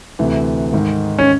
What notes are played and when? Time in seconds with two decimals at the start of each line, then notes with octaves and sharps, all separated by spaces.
0.19 D2 C3 E3
0.73 G#2 D#3
1.19 C#4